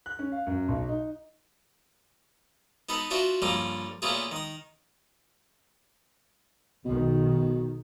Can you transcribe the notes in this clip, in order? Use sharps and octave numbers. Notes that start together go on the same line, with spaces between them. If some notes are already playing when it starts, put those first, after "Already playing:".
F#6
C#4
F5
F#2
B1
D#4
B3 D#4 A4 B4
D4 F4 F#4 C5 E5
G2 D3 F3 A#3 C#4 D4
A#2 A3 B3 C#4 F4 G#4
D#3 D#6
B1 B2 D#3